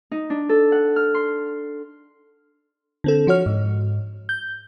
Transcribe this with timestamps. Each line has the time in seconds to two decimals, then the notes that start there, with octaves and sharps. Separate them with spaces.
0.11 D#4
0.30 D4
0.49 A4
0.72 F#5
0.96 F6
1.14 C6
3.04 D3 C4 A4
3.27 F3 F#4 C#5 F6
3.46 G#2
4.29 G6